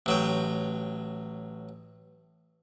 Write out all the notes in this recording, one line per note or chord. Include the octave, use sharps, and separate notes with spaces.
A1 F#3 G5